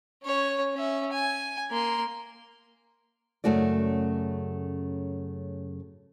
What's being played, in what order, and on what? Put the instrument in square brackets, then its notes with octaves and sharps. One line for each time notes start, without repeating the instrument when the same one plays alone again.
[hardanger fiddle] C#4 C#5
C#4 E5
G#5
A#3 C6
[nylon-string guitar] F#2 C#3 A3 F#4 D5